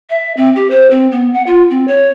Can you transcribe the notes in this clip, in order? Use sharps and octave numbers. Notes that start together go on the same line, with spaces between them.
E5
C4
G4
C5
C4
B3
F#5
F4
C4
C#5